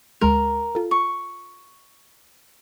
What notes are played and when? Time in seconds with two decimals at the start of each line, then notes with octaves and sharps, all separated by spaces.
0.21 D2 G#3 A#4 C6
0.75 F4 A4
0.91 C#6